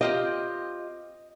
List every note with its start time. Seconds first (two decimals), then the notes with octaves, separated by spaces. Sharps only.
0.01 C4 F4 G4 D#5